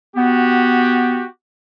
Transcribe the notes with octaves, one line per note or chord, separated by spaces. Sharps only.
B3 F#4 G4